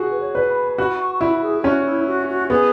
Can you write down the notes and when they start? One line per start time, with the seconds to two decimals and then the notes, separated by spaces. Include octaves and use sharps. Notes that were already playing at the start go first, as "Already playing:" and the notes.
Already playing: F#4 G#4
0.11 B4
0.21 C#5
0.35 B4
0.49 B5
0.78 F#4 B5
1.00 C#6
1.15 C#6
1.21 E4 B5
1.42 G#4
1.59 G#4
1.64 C#4 F#4
1.86 E4
2.08 F#4
2.29 F#4
2.50 B3 G#4